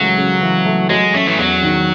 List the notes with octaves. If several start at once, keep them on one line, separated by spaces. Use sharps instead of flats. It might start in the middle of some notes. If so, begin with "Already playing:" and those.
Already playing: C#2 E3 F#3 A3
C#3
E3
A3
F#3 G#3
A3 C#4
E3
E2 F#3
D#3